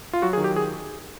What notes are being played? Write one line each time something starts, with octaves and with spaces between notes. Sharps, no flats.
F4
F#3 F#4
G#4
D#3
G4
G#4